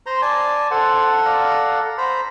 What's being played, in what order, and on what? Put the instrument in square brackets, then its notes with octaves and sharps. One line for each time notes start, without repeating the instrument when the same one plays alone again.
[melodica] C5 A#5 C6
D5 G#5 A5
[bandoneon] A4 F#5 [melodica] C5
[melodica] D5 F5 A#5
C5 A#5 B5